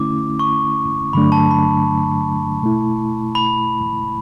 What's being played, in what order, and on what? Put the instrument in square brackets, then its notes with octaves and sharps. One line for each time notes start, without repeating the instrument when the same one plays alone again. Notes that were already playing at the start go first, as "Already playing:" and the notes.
Already playing: [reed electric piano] D3 A3 C#4 E4 [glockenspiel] D6
[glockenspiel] C#6
[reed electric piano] G2 D3 F#3 A3 D4 [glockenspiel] B5
[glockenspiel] A5
B5
[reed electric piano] B2 A3 E4
[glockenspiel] B5